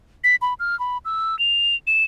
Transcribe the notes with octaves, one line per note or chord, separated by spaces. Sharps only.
B6
B5
F6
B5
E6
F7
E7